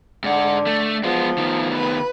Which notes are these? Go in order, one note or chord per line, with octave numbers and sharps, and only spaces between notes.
G#2 D3 F#5
A3
F3 G#3 B3
D#3 B3
B4